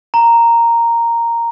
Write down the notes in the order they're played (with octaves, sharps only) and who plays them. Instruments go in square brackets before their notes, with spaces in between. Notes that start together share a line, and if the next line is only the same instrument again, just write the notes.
[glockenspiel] A#5